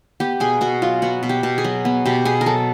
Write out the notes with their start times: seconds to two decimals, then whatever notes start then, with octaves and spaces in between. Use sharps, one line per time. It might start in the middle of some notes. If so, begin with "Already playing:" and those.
0.20 B3 G4
0.40 B2 G#4
0.61 B2 F#4
0.82 F#3 F4
1.02 B3 F#4
1.23 B2
1.29 G4
1.43 B2
1.58 G#4
1.64 F#3
1.85 B3
2.05 B2 G4
2.25 B2 G#4
2.41 A#4
2.46 F#3 A4